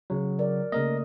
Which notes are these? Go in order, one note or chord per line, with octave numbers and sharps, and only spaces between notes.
C#3 F#3
A#4 D5
C#3 A3 A#3 A#4 D#5